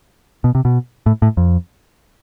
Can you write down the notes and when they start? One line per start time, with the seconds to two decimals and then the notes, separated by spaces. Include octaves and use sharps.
0.44 B2
0.55 C3
0.65 B2
1.06 A2
1.22 A2
1.37 F2